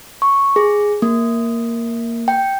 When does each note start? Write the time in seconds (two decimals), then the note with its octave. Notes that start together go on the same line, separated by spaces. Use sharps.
0.22 C#6
0.56 G#4
1.02 A#3
2.28 G5